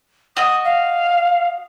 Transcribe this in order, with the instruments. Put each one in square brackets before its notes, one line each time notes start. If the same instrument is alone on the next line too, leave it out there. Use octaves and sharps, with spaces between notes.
[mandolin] F#4 D#5 [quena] D#6
[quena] F5